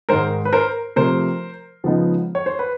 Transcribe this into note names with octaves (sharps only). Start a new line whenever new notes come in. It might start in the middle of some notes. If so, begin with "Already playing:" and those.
G#2 D#3 G#3 A#4 C5
B4
A#4 C5
C3 F3 A3 C4 A#4 C5
C#3 F3 G#3 B3 D#4
C#5
C5
B4